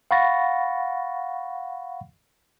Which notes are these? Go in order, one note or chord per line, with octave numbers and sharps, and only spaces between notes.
F5 F#5 B5 C#6 A6 A#6